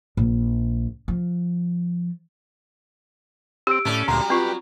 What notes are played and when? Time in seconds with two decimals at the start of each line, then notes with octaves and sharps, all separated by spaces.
0.17 A#1
1.08 F3
3.67 C4 G4 E6 D7
3.85 A2 C#4 A4 D5
4.08 D2 A#2 F#3 G3 A#5 C6
4.30 C4 F4 G4 B4